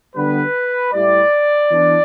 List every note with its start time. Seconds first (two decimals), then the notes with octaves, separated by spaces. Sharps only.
0.15 D3 G3 B3 B4
0.93 A2 G3 E4 D5
1.70 E3 B3 D4